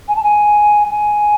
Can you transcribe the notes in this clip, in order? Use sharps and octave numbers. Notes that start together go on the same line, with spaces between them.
G#5
A5
G#5
G#5